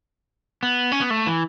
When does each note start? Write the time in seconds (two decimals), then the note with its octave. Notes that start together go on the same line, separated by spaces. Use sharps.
0.63 B3
0.92 C#4
1.01 B3
1.10 A3
1.27 E3